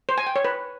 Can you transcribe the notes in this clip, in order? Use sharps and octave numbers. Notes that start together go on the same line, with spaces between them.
C5
G#5
G5
C#5
B4